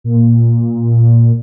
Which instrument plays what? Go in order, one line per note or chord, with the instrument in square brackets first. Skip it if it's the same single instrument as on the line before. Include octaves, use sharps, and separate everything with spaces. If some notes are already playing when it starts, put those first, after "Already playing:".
[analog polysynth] A#2